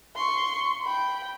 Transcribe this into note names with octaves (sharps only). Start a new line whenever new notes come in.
C6 C#6
G5 B5